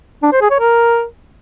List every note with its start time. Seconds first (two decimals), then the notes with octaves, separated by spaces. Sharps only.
0.23 D4
0.32 C5
0.41 G#4
0.50 C#5
0.60 A#4